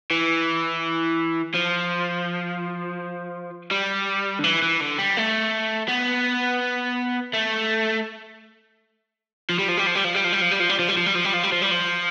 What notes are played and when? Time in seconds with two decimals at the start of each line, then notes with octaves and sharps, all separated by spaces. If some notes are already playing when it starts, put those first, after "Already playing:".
0.11 E3
1.55 F3
3.71 G3
4.39 D3
4.44 E3
4.62 E3
4.80 D3
4.98 G3
5.17 A3
5.89 B3
7.33 A3
9.50 F3
9.59 G3
9.68 F3
9.78 G3
9.87 F3
9.95 G3
10.05 F3
10.15 G3
10.24 F3
10.33 G3
10.42 F3
10.51 G3
10.60 F3
10.69 G3
10.79 F3
10.89 G3
10.97 F3
11.06 G3
11.15 F3
11.25 G3
11.34 F3
11.43 G3
11.52 F3
11.62 G3
11.71 F3